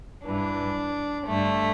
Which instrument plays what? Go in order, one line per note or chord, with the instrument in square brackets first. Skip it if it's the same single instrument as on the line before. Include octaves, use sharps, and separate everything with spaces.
[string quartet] G2 E3 D4
G2 D3 A3